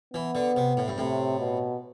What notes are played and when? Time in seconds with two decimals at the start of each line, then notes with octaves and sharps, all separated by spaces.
0.14 E3 B3
0.35 D3
0.56 C3
0.77 A2
0.88 G2
0.98 A2 C3
1.39 B2